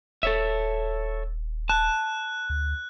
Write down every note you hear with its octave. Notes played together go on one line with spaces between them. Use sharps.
D#1 A4 C#5 E5
A5 F#6
D2